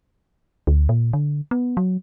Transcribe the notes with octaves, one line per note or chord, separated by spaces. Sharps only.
D2
A#2
D3
B3
F#3